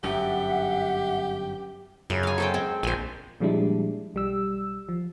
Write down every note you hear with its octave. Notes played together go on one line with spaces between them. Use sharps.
G1 F#2 G4 E5 F#5
F#2 C#3
F5 G#5
A4 C5 G5
G#3 C4
A#1 C5 G#5
A#2 F3 G3 G#3 D4 E4
B1 G3 E6
F3